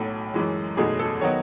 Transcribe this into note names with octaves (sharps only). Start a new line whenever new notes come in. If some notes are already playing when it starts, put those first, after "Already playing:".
Already playing: B1 A2 F#3 A4
F#2 E3 G#3
F#1 E2 B2 A3 D#4 G#4
A4
D#3 F#3 B3 D#4 C#5